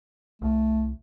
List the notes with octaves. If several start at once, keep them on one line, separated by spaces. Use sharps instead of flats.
C2 A3